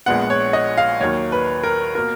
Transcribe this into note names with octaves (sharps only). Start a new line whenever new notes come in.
A#1 A#2 G#3 B3 F#5
C#5
D#5
F5
D#2 D#3 F#3 A#3 C#5
B4
A#4
B2 A#3 A#4